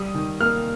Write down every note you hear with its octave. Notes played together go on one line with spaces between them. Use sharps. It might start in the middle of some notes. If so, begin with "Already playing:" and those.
Already playing: G3 D#6
D#3
A#3 F6